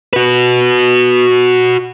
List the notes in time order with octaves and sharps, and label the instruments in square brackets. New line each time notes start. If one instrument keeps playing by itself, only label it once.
[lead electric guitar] F#4 B4